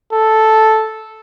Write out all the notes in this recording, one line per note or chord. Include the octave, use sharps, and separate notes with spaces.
A4